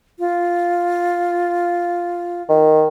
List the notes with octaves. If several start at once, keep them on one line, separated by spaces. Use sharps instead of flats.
F4
D#3